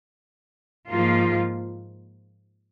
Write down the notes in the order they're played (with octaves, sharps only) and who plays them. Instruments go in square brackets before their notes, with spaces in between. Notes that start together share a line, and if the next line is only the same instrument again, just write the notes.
[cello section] G#2 F3 A#3 F4